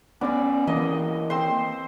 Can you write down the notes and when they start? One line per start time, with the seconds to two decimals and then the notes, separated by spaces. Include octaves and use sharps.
0.21 B3 C#4 D5 B5
0.67 E3 A#3 D#5 B5
1.30 C4 C5 C6